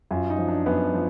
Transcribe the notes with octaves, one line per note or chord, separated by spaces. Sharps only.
F#2 F4
D#4
F3
D4
F#2 B3
F3